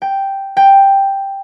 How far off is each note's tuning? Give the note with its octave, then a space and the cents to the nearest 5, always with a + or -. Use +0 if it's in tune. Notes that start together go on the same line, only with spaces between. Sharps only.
G5 +0
G5 +5